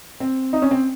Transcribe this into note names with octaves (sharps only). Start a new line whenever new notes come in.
C4
D#4
C#4
C4